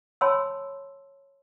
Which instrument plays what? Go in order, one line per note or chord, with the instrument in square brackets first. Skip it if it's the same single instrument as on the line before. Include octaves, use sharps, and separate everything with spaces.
[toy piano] C#5 G#5 A5 B5 C6 E6